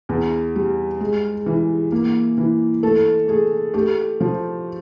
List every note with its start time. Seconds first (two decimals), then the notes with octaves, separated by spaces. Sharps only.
0.09 E2
0.55 G3
1.01 G#3
1.46 E3
1.92 A#3
2.38 E3
2.83 A3 A4
3.28 A3 G#4
3.74 A3 G4
4.20 F3